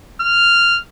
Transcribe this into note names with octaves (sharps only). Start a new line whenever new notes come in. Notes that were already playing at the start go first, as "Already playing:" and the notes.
F6